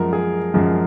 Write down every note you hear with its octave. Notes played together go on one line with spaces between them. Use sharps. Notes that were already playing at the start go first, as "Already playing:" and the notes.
Already playing: F#2 F3 G#3 A#4
G#4
F#2 F3 G#3